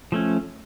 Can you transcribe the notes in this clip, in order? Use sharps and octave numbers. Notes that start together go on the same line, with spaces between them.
F3 A3 C#4